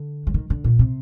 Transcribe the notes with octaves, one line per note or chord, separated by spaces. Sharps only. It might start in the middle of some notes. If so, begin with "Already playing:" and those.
Already playing: D3
F#3
D#3
D3
A#2
C3